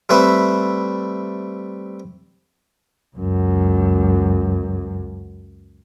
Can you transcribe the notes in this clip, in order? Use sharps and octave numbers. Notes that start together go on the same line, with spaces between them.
G3 A3 C4 B4 C5 E5
C#2 F#2